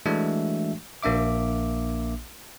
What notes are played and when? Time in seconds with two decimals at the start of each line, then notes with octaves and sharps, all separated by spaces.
0.06 E3 G#3 A3 D4 F#4 E5
1.03 A#1 A#3 D4 E5 D6